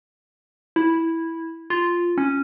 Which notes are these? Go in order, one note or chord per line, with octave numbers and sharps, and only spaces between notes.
E4
F4
C#4